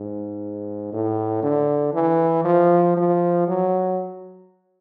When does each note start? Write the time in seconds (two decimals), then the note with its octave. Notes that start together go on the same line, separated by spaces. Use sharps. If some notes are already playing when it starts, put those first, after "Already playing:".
Already playing: G#2
0.93 A2
1.43 D3
1.94 E3
2.45 F3
2.97 F3
3.48 F#3